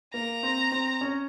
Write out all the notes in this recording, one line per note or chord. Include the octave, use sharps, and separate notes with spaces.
A#3 A#5
C4
C4
C#4